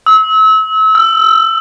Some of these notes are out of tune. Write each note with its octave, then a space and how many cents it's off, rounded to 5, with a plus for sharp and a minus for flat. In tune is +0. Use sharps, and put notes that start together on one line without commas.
E6 -35
E6 +25